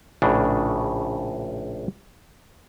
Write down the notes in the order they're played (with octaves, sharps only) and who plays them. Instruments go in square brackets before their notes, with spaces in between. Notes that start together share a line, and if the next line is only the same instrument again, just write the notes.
[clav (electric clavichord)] A#1 A2 C#3 D4